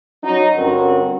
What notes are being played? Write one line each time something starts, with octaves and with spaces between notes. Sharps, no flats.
F#3 C#4 D#4
G2 D3 C4 C#4 F#4 A#4